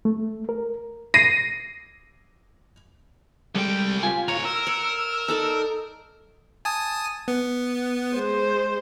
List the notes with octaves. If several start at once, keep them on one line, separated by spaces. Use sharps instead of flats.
A3
A#4
A#6 C7 D#7
C2 G3 G#3 A4 G5
F4 G4 G#5
D2 C#5 F#5 A#5
A#4 E6
C#5 F#5
D#4 A4 D5
G#5 A5 D#6
B3
G#3 C5